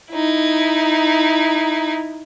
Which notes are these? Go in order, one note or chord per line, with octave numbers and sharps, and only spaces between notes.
D#4 E4